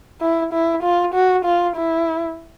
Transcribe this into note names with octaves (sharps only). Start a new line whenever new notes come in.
E4
E4
F4
F#4
F4
E4